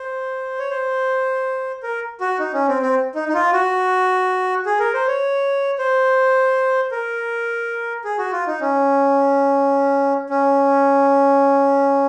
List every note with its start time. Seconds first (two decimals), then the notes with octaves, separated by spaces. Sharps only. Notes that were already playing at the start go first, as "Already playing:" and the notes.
Already playing: C5
0.59 C#5
0.70 C5
1.83 A#4
2.20 F#4
2.39 D#4
2.54 C#4
2.68 C4
2.82 C4
3.15 D#4
3.28 D#4
3.34 F4
3.53 F#4
4.66 G#4
4.80 A#4
4.94 C5
5.07 C#5
5.79 C5
6.91 A#4
8.04 G#4
8.18 F#4
8.32 F4
8.47 D#4
8.61 C#4
10.30 C#4